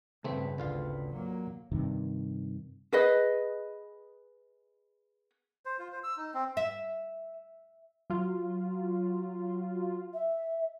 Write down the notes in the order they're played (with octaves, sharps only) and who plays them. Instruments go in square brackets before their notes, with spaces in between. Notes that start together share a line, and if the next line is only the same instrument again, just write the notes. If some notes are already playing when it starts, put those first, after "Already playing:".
[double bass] G2 [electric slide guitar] C#3 B4 [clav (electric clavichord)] A3 C4
[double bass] G#1 D2 [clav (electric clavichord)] D3 F4 F5
[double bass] F#3 A#3
[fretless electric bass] G2 C3 D#3
[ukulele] G#4 B4 D#5
[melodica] C5
F4
C5
E6
D#4
C4
[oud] E5
[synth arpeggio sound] F#3 F4
[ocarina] E5